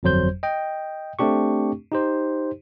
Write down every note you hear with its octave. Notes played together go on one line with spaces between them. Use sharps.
G1 F2 F#3 C5 G6
D#5 G5
A3 C4 D4 G4 C#6
D#4 G4 C5